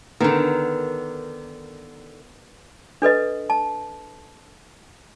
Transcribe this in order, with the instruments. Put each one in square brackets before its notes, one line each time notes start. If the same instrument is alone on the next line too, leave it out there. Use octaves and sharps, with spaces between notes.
[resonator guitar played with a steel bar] D3 D#3 [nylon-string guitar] B3 A#4
[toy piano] D4 A4 B4 D#5
A5